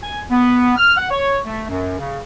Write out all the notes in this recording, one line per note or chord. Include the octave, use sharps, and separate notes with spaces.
G#5
B3
F6
F#5
C#5
A3
F#2
C#3